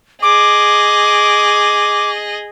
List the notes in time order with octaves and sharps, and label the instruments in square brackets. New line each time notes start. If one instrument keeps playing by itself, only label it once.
[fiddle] G#4 D#5 [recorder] D6